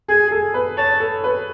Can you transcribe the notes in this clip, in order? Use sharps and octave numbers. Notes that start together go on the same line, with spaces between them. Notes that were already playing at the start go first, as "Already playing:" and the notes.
G#4 G#5
G#4
A4
B4
C#5 A5
A4
B4